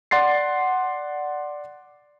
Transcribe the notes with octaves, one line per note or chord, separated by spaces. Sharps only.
D5 F#5 C6 A6 C7